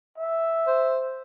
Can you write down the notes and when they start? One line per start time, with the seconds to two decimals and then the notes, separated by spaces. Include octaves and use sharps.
0.18 E5
0.67 C5